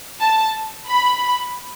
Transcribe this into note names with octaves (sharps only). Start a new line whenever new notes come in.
A5
B5